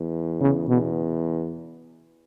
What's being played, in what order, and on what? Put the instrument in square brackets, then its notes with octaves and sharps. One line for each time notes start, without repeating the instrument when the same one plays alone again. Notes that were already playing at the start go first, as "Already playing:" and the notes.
Already playing: [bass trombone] E2
[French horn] C#3
[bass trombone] E2 [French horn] B2